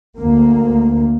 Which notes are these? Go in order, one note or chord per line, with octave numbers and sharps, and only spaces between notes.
D2 A#3